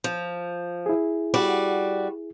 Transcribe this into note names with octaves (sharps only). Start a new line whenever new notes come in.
F3
E4 G#4
G3 F#4 D5